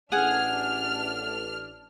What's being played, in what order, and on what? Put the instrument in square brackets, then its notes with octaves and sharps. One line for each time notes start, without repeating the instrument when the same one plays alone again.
[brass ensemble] A1 [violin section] D4 F6 [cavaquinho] G#4 F#5 G#5